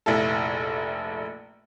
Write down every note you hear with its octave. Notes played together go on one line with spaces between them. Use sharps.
F1 A#1 E4 A4